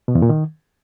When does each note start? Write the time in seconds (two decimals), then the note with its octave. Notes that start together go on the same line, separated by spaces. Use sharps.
0.08 B2
0.15 E2
0.22 A#2
0.29 D#3